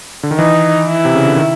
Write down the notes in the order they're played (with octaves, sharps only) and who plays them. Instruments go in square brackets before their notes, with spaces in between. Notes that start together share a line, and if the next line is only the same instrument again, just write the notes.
[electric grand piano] D3
D#3
[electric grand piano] E3 [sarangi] D#4
[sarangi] E4
[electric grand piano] C3
C#3
D3
D#3